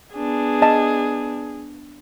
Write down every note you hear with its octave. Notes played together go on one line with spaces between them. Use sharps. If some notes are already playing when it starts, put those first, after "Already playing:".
B3 D4 G#4
D#5 A5